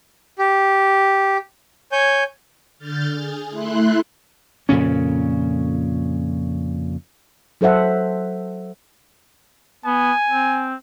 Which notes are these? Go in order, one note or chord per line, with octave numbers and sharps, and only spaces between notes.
G4
C#5 G#5 G6
D3 F6 G6 A6
G#4
A3 E4 C6 F#6
F2 A#2 C#3 C#4
F#3 A4 C5 E5 F#5
B3 G#5
C4